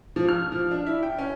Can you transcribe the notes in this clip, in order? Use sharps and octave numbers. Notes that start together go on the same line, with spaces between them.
F3
F6
F3
D4
E4
G5
C#4